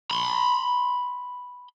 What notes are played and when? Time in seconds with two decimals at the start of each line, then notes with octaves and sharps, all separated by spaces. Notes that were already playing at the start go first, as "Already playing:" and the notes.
0.11 B5 C6